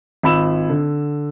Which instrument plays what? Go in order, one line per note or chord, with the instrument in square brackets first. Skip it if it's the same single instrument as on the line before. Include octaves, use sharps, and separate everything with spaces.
[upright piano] G#1 F4 B5 E6 E7
D3